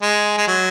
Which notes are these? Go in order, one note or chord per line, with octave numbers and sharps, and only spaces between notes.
G#3
G#3
F#3